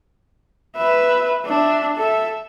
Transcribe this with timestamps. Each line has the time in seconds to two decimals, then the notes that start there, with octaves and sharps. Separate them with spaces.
0.76 B4 E5
1.45 D4 E5
1.96 A4 E5